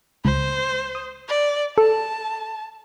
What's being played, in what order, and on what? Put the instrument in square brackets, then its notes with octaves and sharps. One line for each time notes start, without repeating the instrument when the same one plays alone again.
[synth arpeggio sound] C#2 [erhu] C5
[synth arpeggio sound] D#6
[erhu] D5
[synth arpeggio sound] A4 [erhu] A5